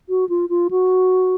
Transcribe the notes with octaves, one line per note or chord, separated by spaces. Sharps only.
F#4
F4
F4
F#4